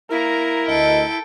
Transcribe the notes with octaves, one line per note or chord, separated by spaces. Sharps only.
A#3 E4 A#4 A#5
D2 A4 D#5 G5